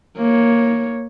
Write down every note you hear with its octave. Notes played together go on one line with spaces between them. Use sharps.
A#3 C#5